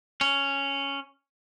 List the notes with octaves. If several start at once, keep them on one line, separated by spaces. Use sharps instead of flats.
C#4